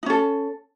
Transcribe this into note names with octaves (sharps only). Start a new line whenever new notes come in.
C#4 D#4 A4